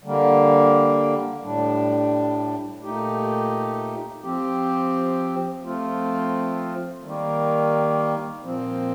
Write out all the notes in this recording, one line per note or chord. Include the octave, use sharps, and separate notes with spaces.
D3 G3 A#3
A2 G3 D4
A#2 A3 D#4 G4
F3 C4 G4
F3 A3 C4 F4
D#3 G3 A#3
A#2 F3 C4